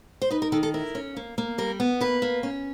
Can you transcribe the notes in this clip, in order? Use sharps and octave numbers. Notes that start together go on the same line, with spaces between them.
C5
D#4 B4
A#4
D#3 A4
A4
E4 A#4
C#4
A#3
A#3
G3 A#4
B3
A#3 B4
A#3
C#4